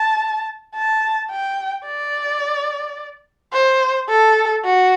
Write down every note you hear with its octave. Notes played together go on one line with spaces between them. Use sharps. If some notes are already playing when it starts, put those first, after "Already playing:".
Already playing: A5
A5
G5
D5
C5
A4
F#4